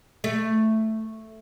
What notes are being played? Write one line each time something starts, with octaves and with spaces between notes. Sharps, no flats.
A3